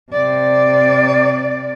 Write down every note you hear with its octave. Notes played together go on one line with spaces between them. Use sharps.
C3 D5